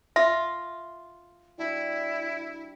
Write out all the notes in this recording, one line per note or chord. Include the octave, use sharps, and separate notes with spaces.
F4 E5
G3 D4 E4 F#4